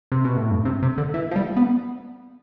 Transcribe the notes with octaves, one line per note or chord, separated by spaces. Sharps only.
C3
B2
A2
G2
C3
C3
D3
E3
F3
G3
B3